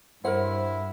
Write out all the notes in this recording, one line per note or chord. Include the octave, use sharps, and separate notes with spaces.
G2 E4 A#4 C5 C#5 F#5